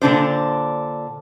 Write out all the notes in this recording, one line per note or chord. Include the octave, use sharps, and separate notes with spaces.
A#2 D3 D4 C5